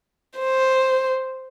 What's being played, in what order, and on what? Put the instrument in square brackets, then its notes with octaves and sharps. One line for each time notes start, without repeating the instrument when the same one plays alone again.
[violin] C5